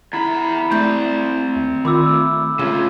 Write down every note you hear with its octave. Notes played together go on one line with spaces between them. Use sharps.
E2 E4 A#5 B5
A3 C4 D5 G6
D#2
D#3 F4 B5 D6 E6
A3 E6
C#3 A3 C#4 F4